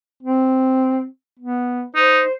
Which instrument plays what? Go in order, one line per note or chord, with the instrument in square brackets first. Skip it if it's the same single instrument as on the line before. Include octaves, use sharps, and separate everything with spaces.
[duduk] C4
B3
[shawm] D#4 [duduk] C5